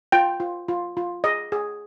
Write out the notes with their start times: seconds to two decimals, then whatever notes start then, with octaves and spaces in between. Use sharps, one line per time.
0.12 F4 G5
0.40 F4
0.68 F4
0.97 F4
1.24 G#4 D#5
1.52 G#4